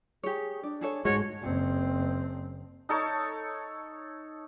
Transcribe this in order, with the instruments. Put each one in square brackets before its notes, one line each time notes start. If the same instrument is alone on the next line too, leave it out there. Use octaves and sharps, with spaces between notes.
[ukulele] G4 C#5 [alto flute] G#4
[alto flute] D4 [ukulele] D5
[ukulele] G#4 A4 C#5
[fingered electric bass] G#2 G#3 [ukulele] F#4 [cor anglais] C#5 [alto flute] A5
[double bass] F#1 C4
[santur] D#4 A4 C#5